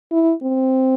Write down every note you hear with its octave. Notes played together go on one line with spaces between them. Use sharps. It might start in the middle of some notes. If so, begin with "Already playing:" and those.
E4
C4